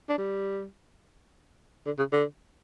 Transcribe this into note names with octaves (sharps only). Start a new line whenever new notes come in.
D4
G3
D3
C#3
D3